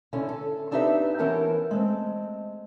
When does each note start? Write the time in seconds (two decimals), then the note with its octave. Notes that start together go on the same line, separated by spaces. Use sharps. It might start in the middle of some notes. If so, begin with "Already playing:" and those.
0.13 D3 C#4 E4
0.29 A4
0.71 C4 D4 D#4 G4 B4 E5
1.19 E3 B3 C#4 A#4 G5 A5
1.71 G#3 A3 C4